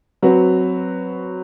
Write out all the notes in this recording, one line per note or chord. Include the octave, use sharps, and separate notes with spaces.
F#3 C4 F#4 B4